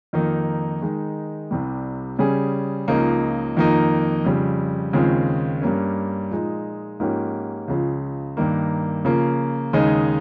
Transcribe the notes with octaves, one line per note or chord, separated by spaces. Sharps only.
F2 D#3 A#3 D#4
D#3 G#3 D#4
C2 C3 G3
C#3 G3 C#4 G#4
C#2 C#3 F3 A#3 D#4
F2 D#3 A#3 D#4
F2 C#3 G3
D#2 C#3 F3 G#3 C4
G2 G3 A#3 C#4
A#2 F3 G#3 D#4
G#2 F3 A#3 C#4 G4
C#2 C#3 F3
G2 D#3 A#3
C#3 F3 A#3
D#2 C#3 G#3 D#4